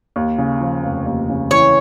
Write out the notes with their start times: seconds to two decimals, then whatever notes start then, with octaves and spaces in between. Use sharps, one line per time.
0.16 D#2
0.38 C#3
0.60 F3
0.84 F1
1.06 D#2
1.29 C#3
1.51 E3 C#5